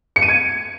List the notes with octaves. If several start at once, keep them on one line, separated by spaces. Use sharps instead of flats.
C#7
D#7
G#6